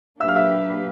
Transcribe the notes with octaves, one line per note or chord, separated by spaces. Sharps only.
F#3 A#3 D4 G4 B4 E5 E6
F5 F6
E5 E6